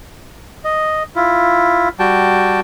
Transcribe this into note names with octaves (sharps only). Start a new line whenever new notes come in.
D#5
E4 F4
G3 F#4 G5 A5